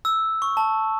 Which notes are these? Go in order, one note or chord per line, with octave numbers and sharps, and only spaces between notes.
E6
C#6
A5